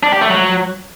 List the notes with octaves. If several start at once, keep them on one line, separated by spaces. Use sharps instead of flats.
D4
G4
A3
F#3